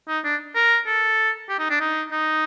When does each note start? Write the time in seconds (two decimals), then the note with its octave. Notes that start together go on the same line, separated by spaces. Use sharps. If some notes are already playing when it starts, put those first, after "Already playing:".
0.08 D#4
0.24 D4
0.55 A#4
0.87 A4
1.49 G4
1.59 D#4
1.70 D4
1.80 D#4
2.12 D#4